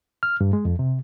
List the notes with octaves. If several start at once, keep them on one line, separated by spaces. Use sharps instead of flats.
F6
G2
G#3
F2
C3